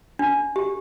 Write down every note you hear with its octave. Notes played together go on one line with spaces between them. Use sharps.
D4
G4